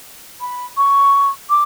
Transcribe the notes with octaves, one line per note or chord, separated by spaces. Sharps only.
B5
C#6
D6